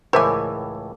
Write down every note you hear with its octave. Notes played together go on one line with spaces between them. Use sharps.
C#2 A2 E3 A#4 C5 E5 G#5 D6